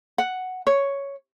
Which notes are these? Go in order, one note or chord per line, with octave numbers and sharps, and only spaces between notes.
F#5
C#5